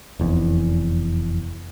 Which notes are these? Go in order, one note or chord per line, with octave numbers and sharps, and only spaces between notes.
F1 E2